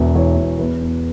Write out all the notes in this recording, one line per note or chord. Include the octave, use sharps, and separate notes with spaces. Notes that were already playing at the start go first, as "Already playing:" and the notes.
Already playing: E1 E2 E5
E3 C#5
E1
E2 B4
E2